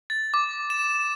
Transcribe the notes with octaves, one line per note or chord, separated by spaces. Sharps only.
A6
D6
E7